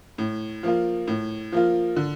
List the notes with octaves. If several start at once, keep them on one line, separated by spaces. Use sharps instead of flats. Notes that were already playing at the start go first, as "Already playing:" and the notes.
A2
F3 A#3 F4
A2
F3 A#3 F4
D3